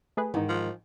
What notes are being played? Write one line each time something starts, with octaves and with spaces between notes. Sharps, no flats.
A3 G#4 B4
G#2 D#3 E3 D#4
F3